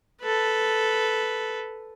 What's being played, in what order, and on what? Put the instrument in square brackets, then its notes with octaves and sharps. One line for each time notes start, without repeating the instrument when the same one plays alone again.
[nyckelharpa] A4 B4